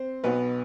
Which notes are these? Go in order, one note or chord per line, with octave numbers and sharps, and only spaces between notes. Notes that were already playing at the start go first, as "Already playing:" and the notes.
Already playing: C4 C5
B1 B2 B3 B4